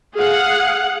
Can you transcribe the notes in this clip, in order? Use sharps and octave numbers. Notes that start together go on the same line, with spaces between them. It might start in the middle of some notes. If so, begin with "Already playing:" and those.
G#4 F5 F#5